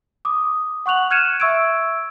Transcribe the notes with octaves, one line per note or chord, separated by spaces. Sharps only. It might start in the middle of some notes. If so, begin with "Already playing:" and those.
D6 D#6
F#5 C#6 F#6 F7 F#7
F6 F#6 G#6 C#7 D#7 E7
E5 C#6 E6 G#6 D7